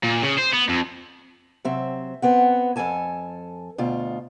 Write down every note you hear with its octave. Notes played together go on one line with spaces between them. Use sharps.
A#2
C#3
C5
B3
F2
C3 F#3 C4 E5
B3 C4 F#5
F2 C3 A4 G#5 A5
D2 B2 F4